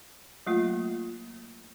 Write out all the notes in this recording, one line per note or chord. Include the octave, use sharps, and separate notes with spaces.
F#3 A3 A#3 F4